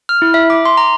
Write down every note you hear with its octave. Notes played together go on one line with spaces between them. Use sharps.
F6
E4
E5
D6
C6
A#5